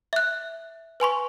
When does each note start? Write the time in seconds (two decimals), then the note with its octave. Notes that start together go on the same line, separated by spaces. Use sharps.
0.13 E5 F#6
1.00 B4 G#5 C6 C#6